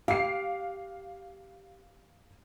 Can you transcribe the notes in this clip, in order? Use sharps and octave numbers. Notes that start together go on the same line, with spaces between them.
G4 F5 C7